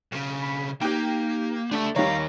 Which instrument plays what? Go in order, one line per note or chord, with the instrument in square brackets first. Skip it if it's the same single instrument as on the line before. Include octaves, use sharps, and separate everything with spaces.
[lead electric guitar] B1 C#3
[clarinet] B5
[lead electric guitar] A#3 [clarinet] D#4 [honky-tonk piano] G4 G5
[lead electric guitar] A3 [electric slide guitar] D4 A4 E5
[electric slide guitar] D#3 A#3 [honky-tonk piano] G3 C#5 [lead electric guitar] F5 [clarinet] A#5